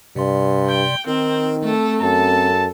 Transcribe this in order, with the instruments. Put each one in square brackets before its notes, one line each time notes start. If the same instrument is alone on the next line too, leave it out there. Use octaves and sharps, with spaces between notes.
[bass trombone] G2 [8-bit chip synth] C3 D5 C6
[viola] G5
[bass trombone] D#3 [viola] C4 [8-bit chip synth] D#4 A#4
[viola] A3 A4 [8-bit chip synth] C4
[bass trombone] F#2 [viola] A4 [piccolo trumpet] A5